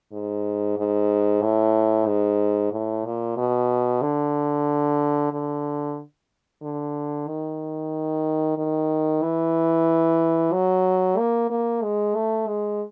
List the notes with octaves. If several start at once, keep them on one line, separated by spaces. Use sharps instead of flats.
G#2
G#2
A2
G#2
A2
A#2
B2
D3
D3
D3
D#3
D#3
E3
F#3
A#3
A#3
G#3
A3
G#3